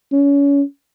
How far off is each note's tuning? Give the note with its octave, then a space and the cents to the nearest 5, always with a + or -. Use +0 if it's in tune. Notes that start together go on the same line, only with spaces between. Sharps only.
C#4 +30